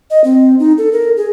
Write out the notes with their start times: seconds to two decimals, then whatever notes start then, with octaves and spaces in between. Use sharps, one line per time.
0.10 D#5
0.24 C4
0.59 D#4
0.78 A4
0.92 A#4
1.17 G#4